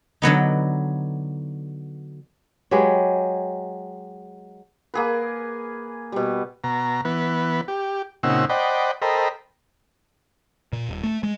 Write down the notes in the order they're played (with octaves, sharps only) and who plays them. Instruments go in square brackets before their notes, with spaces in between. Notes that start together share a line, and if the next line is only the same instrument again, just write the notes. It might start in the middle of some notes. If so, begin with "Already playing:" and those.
[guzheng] D3 F#3 B3 D#4
[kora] F#3 G#3 G4 B4
[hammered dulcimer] A#3 G#4 B4
B2 G3
[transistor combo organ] B2 A#5
E3 B3 B4
G4
A#2 C#3 C4 D#4 F#5 E6
C5 D5 D#5 F#5 G5 B5
A4 A#4 C5 D#5 G5 B5
[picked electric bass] A#2
D#1
A3
G#3